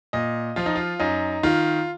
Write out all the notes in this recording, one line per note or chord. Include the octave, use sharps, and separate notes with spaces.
A#2 D#5
F3 F4
D#4
F4
F#2 D#4
D#3 F4